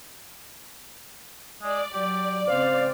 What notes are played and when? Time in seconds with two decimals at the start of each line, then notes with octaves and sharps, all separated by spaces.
1.62 G#3 D5
1.93 F#3 G4
2.48 G#1 C#3 C4 C5 F5